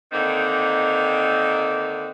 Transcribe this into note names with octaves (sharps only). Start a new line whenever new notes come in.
D3 D#3 A#3 C4 D#4